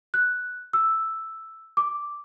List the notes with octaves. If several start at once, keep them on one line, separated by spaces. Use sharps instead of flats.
F#6
E6
D6